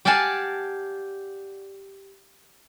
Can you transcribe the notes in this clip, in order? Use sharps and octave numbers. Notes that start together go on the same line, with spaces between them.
G4 D5 F5 F#5 G#5 A5